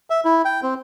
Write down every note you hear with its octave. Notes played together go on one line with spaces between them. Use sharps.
E5
E4
G5
C4